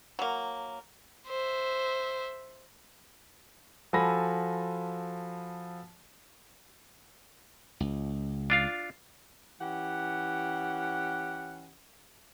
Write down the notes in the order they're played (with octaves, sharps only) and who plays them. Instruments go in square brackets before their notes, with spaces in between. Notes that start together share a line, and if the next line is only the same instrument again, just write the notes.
[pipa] F#3 A#3
[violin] C5 E5
[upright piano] F3 F#4 A4 G#5 B5 A#6
[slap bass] C#2
[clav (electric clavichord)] D4 F4 F5
[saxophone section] E3 C#4 G4 F#5